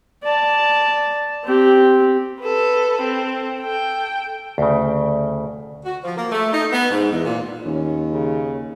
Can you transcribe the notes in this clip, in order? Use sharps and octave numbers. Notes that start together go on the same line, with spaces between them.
D5 A5
C4 G4
A4 B4
C4 A4
A4 G5
D2 C#3
F#4
F3
A#3
A3
D#4
B3
G#2
E2
A#2
D#2 C#4
C#3